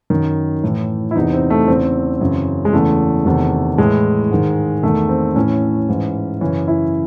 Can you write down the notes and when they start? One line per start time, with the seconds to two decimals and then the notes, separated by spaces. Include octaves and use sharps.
0.10 F#2 D#3
0.63 A2 E3
1.11 E4
1.16 E2 C3 E3 D#4
1.33 C4
1.50 A3
1.68 E2 C#3 E3 C4
2.20 F#2 C#3 E3
2.65 G#3
2.73 E2 C#3 E3 A3
3.26 E2 C3 D#3
3.78 A2 E3 G#3
4.31 G#2 D#3
4.83 E2 D#3 A3
5.09 C4
5.36 A2 E3 C#4
5.88 G#2 E3
6.41 F#2 C#3 E3 C#4
6.67 E4